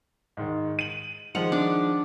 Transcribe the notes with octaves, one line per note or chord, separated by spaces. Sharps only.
G#2 D#3
D#7 F#7
D#3 F3 G#3 F#5
D4